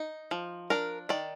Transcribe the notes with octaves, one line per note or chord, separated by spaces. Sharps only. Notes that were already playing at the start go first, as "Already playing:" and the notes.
Already playing: D#4
F3
D4 A#4
D#3 D5